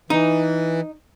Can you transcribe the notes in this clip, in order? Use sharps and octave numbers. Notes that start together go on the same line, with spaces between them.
E3 D#4